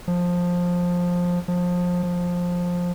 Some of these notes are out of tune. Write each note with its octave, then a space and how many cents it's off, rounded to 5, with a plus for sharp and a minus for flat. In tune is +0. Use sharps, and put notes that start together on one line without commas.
F3 +15
F3 +25
F3 +15